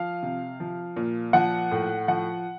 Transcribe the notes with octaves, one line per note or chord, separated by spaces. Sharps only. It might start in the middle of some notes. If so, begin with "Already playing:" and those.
Already playing: F3 F5
C3
F3
A#2
F3 F#5
A2
F3 F#5